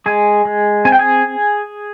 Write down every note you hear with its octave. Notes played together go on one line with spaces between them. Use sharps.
G#3 G#4 G#5
G#3
C4 G#5
G5
G#4 G#5